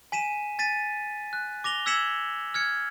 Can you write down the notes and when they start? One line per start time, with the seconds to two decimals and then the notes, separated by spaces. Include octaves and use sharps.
0.12 G#5 B6 D#7 E7
0.59 G#5 A6 B6 D#7
1.33 F#6
1.64 D6 A#6 F7 G7
1.86 E6 G#6 B6 C#7 E7 F#7
2.54 F6 G#6 C#7